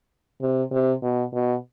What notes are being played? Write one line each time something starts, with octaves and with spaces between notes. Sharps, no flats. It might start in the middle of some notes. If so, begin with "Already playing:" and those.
C3
C3
B2
B2